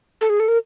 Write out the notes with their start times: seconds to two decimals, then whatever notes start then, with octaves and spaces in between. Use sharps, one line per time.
0.21 A4
0.30 G#4
0.40 A4
0.48 A#4